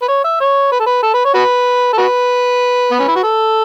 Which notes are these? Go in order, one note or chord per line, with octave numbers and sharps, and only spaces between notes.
B4
C#5
E5
C#5
B4
A4
B4
A4
B4
C#5
F#4 B4
A4
F#4 B4
B3
C#4
E4
F#4
A4